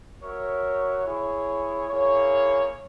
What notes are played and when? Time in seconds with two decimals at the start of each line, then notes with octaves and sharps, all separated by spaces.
0.20 F#4 A#4 C#5 E5
1.04 E4 G#4 C#5
1.89 A#3 E4 G#4 C#5